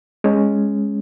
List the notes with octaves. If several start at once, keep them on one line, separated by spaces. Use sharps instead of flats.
G#3 C#4